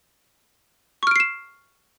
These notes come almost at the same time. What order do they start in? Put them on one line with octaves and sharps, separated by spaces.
C#6 F6 D7 C7 E7